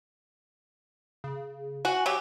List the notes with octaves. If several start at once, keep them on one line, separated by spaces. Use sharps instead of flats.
C#3
F#4 G#5
F#3 G4